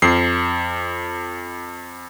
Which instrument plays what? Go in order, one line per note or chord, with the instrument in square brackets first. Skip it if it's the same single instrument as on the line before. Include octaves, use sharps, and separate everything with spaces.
[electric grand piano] F2 C7